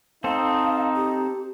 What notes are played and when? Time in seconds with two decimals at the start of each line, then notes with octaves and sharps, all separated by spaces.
0.24 C4 D#4 A4 C5 F5
0.96 G4